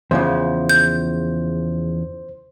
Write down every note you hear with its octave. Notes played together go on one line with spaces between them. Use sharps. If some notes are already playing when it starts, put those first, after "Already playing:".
E2 C#3 F3 C5
G6